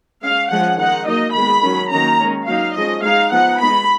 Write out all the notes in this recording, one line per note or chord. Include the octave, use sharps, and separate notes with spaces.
G#3 C#4 F5
F3 G#3 C#4 F#5
D#3 G#3 D#4 F#5
F#3 A#3 D#4 D#5
D#3 G#3 B3 B5
D#3 F#3 C#4
D#3 F#3 A#3 C#4 A#5
D#3 G#3 C#4
F#3 A#3 D#4 F5
F3 G#3 C#4 D#5
G#3 D#4 F5
F3 B3 D#4 F#5
G#3 B3 D#4 B5